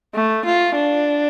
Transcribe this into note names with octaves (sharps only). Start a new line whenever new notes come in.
A3
F4
D4